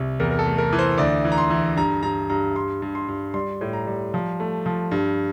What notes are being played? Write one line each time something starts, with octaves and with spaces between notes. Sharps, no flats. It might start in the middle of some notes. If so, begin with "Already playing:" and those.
Already playing: C2
E2 A#4
A#4
A4
A3
A#4
E3
C5
D2 D5
E3
A#5
C6
E3
G2 A#5
G2 A#5
G2 A#5
G2 C6
G2
C6
G2
G3 C6
A2
A#5
G3
F3
A3
F3
G2